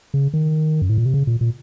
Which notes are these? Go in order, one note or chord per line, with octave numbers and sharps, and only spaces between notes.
C#3
D#3
F#2
A2
A#2
C3
C#3
A#2
A#2